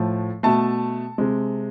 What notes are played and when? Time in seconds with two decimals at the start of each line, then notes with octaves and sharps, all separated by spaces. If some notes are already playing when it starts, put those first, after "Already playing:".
Already playing: A2 F3 A3
0.43 B2 A3 A5
1.18 C3 G#3